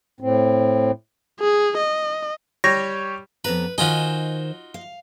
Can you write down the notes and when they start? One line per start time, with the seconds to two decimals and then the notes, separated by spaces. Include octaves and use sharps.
0.21 A2 C4
1.40 G#4
1.77 D#5
2.64 G3 G4 C#5 A#6
3.45 F2 B3 B4 A#5
3.78 D#3 D#4 F4 F#4 C5 G#5
4.74 F5